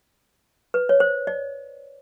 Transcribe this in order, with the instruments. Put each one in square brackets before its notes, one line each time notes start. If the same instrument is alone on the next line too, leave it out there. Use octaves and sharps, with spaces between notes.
[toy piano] B4
C#5
C5
D5